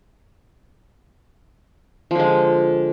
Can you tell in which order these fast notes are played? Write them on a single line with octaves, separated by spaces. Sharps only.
F3 D3 G#3